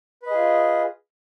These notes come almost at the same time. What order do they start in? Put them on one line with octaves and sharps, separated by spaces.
B4 D#5 G#4 F4